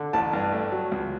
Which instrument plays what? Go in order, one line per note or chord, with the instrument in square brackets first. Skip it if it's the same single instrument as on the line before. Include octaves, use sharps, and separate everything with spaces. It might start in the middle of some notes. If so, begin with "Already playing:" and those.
Already playing: [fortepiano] D3
A1 A5
G2
A3
F#3
C#2